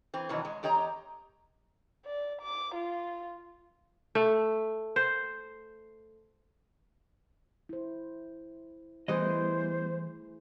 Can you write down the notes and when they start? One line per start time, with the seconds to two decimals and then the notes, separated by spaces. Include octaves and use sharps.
0.14 E3 C4
0.29 F2 B2 D#3 E3 F#3
0.45 G#3
0.63 E2 G4 C#5 D#5 A#5
2.06 D5
2.42 D6
2.75 F4
4.15 A3
4.96 C5
7.69 E4 C5
9.08 E3 G3 A3 B3 E4 G#4 C5 D#5